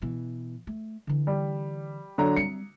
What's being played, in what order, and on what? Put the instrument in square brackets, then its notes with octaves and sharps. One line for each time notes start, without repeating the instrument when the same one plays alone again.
[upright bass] B2 E3
A3
D3 E3
[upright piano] G3
D3 F#3 A#5
[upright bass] G3 C4 [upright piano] C#7